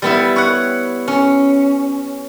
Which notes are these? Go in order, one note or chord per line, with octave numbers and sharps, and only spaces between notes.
G3 B3 E4
C#5 F#5
C#4